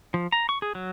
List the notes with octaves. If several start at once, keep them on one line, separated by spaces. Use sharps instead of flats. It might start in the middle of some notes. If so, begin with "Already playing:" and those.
F3
A#5
C#6
G#4
F#3